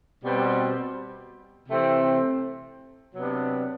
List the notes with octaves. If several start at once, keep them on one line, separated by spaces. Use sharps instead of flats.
B2 G3 C4
C3 E3 A3 C4
C3 F#3 B3 D4